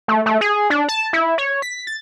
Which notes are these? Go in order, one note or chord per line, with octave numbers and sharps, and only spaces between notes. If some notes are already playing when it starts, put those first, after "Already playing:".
A3
A3
G#4
D4
A5
E4
C#5
B6
A6